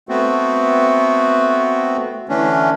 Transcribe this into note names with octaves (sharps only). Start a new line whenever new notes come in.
A3 B3 C4 F#4
D3 E3 A3 C#4 D4